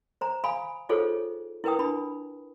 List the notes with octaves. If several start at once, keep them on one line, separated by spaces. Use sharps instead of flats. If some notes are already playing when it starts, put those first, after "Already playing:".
C5 A#5
F5 G#5 B5 D#6
D#4 F4 G#4 A4 C5 C#5
E4 A#4 B4 G5 D#6
D4 E4 B5